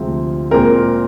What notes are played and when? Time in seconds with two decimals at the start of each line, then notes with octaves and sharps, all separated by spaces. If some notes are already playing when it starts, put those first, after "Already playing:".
Already playing: D2 C3 F3 G#3 C4
0.51 A#2 G#3 C4 A#4